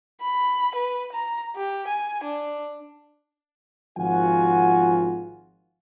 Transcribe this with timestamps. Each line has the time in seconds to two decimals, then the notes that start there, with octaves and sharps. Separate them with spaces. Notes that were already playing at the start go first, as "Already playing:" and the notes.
0.22 B5
0.75 B4
1.13 A#5
1.56 G4
1.88 G#5
2.24 D4
3.97 G#1 F3 F4 F#4 F#5 G#5